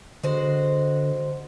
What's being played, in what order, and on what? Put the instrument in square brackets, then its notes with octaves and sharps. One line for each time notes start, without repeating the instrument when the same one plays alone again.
[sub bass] D3 [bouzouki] G#3 F#4 C5